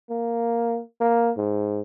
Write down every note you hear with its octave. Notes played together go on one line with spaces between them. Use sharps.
A#3
A#3
G#2